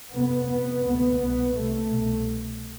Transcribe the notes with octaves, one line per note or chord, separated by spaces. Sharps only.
F2 C3 B3
F2 C3 B3
D2 C3 B3
C2 B2 B3
C2 C3 A3
C2 B2